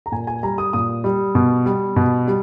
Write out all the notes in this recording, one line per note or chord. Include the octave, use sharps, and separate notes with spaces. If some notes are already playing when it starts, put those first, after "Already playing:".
A#5
A#2 G#5
G#5
G3 A#5
D#6
A#2 D#6
G3
B2
G3
B2
G3